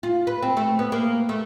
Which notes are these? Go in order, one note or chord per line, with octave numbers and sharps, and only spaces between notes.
F4
B4
C4
A3
B3
A#3
A3